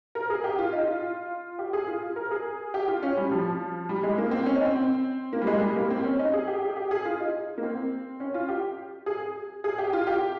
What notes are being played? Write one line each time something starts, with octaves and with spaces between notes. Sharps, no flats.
A#4
G#4
G4
F4
D#4
F4
G4
G#4
F4
A#4
G#4
G4
F4
C#4
G3
F3
G3
G#3
A#3
C4
C#4
D#4
C4
C4
A#3
G3
G#3
G3
A#3
C4
C#4
D#4
G#4
G4
G#4
G4
G#4
F4
D#4
A#3
C4
C#4
F4
G4
G#4
G#4
G4
F4
G4